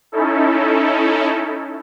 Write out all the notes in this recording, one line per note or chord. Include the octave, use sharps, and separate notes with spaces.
C#4 D#4 E4 A4